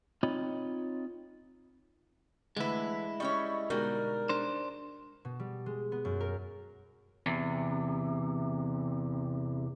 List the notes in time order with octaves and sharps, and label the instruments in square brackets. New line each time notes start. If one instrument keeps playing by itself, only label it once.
[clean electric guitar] C4 D#4 F4 C#5 D#5 B5
[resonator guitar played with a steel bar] D3 B4 [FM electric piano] E3 A3 [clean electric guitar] G#3 E4
[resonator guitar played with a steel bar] G3 C#4 C#5 [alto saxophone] D#5 [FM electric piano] C#6
[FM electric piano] B2 D3 G#3 [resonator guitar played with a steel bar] G3 D#4 F#4 [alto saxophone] A#4
[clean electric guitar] D4 C5
[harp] B2
G3
G#3
B3
F#2
A#4
[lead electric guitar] E2 C3